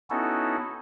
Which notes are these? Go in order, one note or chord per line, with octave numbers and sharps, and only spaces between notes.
B3 C#4 D#4 E4 F#4 A4